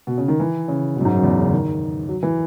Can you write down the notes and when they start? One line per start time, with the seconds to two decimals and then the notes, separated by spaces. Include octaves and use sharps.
0.07 B2
0.18 C#3
0.28 D#3
0.40 E3
0.68 C#3
0.96 B2
1.01 F#2
1.05 G#2
1.15 F#2
1.23 E2
1.38 C#3
1.51 D#3
2.09 F#3
2.23 E3